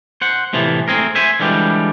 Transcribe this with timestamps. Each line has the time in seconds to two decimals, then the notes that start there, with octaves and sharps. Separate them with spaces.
0.21 C5 F#5
0.53 A2 C3 E3 F3
0.88 A3 C4 G#4 A#4
1.15 C5 E5 G#5
1.40 D3 E3 F3 G3 G#3 G4